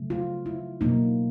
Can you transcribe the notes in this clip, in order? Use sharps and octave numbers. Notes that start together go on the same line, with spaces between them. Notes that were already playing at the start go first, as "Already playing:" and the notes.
Already playing: C#3 F#3 A3
F4
E4
B2 F#3 A#3 D#4